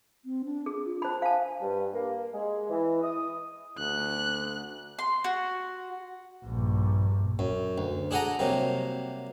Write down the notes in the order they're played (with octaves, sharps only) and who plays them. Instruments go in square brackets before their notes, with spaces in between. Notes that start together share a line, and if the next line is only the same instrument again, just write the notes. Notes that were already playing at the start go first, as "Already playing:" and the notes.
[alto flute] C4
D4
[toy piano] G#4
[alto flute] F4
[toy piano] C5 B5 [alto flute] A5
[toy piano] F5 A5 [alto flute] G#5
[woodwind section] G2
A#3
G#3
E3
D#6
[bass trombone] D2 [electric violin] F#6
[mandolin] C6
F#4
[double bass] A#1 G2
[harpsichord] F#2
D2
D4 G#4 A4 F#5 G#5 A#5
C3 F#3 G3 A#3